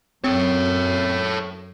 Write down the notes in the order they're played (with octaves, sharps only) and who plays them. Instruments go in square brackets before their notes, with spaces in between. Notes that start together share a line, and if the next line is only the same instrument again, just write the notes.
[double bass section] F#2 [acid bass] C4 [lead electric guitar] A4 C#5